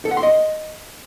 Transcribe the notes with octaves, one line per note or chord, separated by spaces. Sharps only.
A4
F#5
C6
D#5